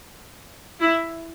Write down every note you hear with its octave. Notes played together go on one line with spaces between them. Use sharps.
E4